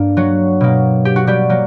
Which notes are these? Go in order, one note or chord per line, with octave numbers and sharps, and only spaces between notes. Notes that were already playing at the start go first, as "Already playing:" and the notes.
Already playing: G2 A#3 D4
F#3 F#4
B2 A#3
G4
F#4
G3 G4
F#3 A#3